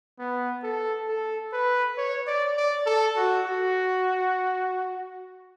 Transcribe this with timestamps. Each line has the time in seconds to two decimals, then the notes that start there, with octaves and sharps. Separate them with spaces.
0.19 B3
0.64 A4
1.08 A4
1.53 B4
1.98 C#5
2.27 D5
2.57 D5
2.86 A4
3.16 F#4
3.46 F#4